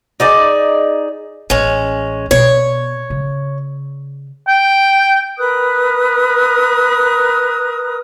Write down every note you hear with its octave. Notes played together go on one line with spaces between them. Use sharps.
D#4 G#4 D5
A1 G#3 C#4
B2 B3 C#5
C#3
G5
A#4 B4 D#6 F#6